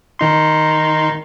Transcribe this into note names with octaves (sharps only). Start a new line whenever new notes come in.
D#3 D#4 C6